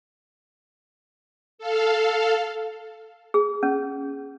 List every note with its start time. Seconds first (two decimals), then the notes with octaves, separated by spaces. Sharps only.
1.58 A4 F5
3.34 G#4
3.63 C#4